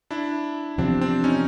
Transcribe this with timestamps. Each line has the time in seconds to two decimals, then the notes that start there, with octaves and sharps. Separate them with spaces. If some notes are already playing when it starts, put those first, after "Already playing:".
0.11 D4 E4
0.78 E2 C3 F3 C4 D4
1.01 C4 D4
1.24 C#4 D#4